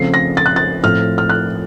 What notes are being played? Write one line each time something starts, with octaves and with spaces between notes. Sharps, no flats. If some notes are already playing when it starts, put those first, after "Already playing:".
Already playing: C#3 F3 A3 C4 C7
A#6
A6
F#6
A6
A2 F3 A3 C4 F6
F6
F#6